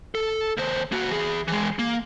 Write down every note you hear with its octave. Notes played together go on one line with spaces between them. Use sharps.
A4
D#2 C5
A#3 F#4
E3 G#4
E3 G#3
A#3